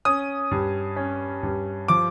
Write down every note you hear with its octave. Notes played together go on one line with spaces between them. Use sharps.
C#4 D#6
G2
C#4
G2
F3 D6